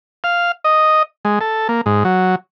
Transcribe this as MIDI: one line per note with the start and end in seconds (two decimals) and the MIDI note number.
0.24 0.52 77
0.64 1.03 75
1.25 1.39 56
1.41 1.68 69
1.69 1.81 58
1.86 2.04 44
2.05 2.35 54